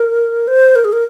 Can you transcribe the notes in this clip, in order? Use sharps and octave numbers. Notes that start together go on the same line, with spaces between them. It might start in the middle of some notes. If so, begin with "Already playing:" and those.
Already playing: A#4
C5
A#4
G#4
A#4